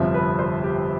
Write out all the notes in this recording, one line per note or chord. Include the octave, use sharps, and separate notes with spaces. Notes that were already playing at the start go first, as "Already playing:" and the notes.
Already playing: G1 F2 C3 F3 E5
B4
C5
G4